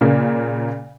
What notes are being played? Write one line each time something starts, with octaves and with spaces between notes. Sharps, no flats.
A#2 C#3 A#3